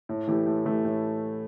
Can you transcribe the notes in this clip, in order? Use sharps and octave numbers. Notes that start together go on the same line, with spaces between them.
A2
E3 A3 E4 G4
A2
E3 A3 E4 G4
A2